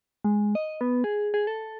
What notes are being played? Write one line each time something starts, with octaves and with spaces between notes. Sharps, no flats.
G#3
D#5
B3
G#4
G#4
A4